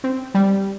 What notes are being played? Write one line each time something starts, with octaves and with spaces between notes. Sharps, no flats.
C4
G3